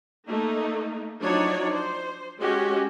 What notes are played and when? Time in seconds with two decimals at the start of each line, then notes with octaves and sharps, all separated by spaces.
0.27 A3 A#3 D#4
1.21 F3 F#3 D4 D#4 C#5 D5
1.74 C5
2.39 G#3 C#4 F#4 G4